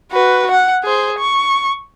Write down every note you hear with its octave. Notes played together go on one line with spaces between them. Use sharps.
F#4 B4
F#5
G#4 C5
C#6